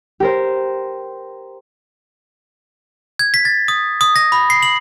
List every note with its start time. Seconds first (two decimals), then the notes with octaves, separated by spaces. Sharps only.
0.20 G4 A#4 C5
3.19 G#6
3.34 B6
3.45 A6
3.68 D#6
4.01 D#6
4.16 A#6
4.32 B5
4.50 C7
4.63 F#7